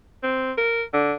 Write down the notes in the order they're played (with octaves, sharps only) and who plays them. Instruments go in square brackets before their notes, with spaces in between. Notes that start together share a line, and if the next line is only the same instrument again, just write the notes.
[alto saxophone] C4
A#4
D3